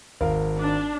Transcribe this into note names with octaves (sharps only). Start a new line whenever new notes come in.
G#1 A#4 F5
D4